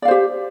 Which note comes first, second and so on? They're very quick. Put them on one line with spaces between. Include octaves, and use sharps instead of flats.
D5 F5 C5 G4